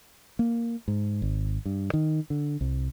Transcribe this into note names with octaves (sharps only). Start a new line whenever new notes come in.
A#3
G#2
G#1
G2
D#3
D3
C2